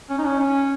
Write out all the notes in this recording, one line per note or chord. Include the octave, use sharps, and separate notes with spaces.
C#4
D#4
C#4
C#4